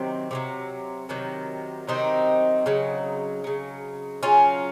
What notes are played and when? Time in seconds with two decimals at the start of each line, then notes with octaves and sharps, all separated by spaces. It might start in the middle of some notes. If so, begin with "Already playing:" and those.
Already playing: C3 D#3 F#3 C4
0.31 C3 D#3 F#3
1.09 C3 D#3 F#3
1.87 C3 D#3 F#3 C4 D#4
2.66 C#3 F#3
3.44 C#3 F#3
4.23 C#3 F#3 C#4 F4